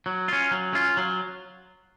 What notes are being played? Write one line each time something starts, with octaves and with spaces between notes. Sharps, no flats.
F#3
C#4 F4
F#3
C#4 F4
F#3